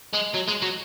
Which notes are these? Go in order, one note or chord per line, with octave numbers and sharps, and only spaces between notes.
G#3
F#3
G#3
F#3